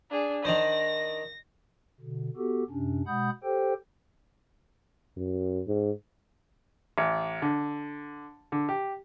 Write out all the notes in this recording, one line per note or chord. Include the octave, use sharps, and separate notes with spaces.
D4 G#4
D#3 D4 C5 A#6
B2 D3
B3 F#4 G4 A4
F#2 C3 C#4 D4
B2 G#3 F#5 B5 D#6 G6
G4 A4 C5 G5
F#2
G#2
A1
D3
D3
G4